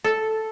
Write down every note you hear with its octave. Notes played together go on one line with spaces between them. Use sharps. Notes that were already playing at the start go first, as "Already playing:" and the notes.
A4